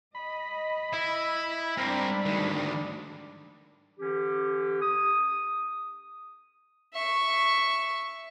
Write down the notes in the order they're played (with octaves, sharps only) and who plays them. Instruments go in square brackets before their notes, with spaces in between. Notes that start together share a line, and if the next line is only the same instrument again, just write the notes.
[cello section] D#5 [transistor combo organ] B5
[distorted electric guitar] E4
[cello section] G#2 G3 D4 [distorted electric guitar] C4 A#4
[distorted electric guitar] D2 D#3
[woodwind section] D3 E3 C#4 G4
D#6
[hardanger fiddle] E5 C#6